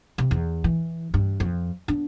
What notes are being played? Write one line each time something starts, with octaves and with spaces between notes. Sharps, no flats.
C3
E2
E3
G2
F2
B3 D4